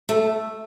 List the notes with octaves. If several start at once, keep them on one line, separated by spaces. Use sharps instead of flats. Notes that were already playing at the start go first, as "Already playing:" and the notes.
A3